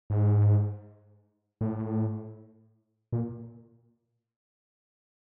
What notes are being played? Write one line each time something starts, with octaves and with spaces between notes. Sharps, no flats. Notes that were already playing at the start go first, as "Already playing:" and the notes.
G#2
A2
A#2